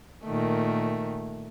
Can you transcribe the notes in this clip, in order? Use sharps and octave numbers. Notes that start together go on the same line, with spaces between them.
A#2 D#3 A3